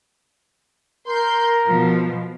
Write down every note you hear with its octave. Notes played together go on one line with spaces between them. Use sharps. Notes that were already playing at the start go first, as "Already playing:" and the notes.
A#4 C6 G6
B2 F3